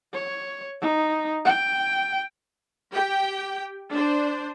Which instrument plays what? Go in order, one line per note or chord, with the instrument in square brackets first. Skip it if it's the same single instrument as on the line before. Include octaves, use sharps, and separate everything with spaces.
[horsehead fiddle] C#5
D#4
G5
[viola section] G4 G5
D4 C5